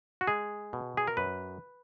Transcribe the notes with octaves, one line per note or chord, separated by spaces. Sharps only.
F#4
G#3 G#4
B2
G#4
A#4
F#2 B4